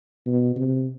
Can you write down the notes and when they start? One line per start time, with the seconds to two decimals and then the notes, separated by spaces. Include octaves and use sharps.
0.26 B2
0.56 C3